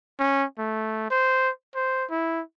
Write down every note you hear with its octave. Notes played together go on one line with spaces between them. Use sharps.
C#4
A3
C5
C5
E4